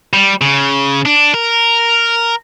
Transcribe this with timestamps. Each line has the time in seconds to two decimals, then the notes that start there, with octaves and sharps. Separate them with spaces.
0.13 G3
0.41 C#3
1.06 D4
1.34 A#4